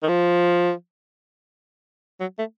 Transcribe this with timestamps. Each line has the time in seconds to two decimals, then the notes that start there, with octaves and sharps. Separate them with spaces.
0.03 D#3
0.08 F3
2.20 F#3
2.39 A3